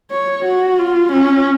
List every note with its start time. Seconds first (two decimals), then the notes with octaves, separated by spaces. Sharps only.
0.11 C#5
0.45 F#4
0.79 F4
1.12 C#4